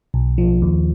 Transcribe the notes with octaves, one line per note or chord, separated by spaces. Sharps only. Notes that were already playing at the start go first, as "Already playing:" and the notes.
B1
F3
D#2